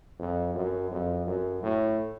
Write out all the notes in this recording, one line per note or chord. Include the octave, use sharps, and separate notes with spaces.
F2
F#2
F2
F#2
A2